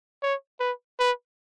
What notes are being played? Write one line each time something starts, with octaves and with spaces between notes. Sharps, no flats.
C#5
B4
B4